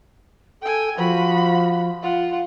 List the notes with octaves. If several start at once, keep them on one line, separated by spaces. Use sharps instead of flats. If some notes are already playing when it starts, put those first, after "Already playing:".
A4 G5 G#5
F3 F#4 B5
F4 F#5